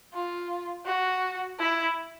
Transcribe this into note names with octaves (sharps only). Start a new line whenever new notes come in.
F4
F#4
E4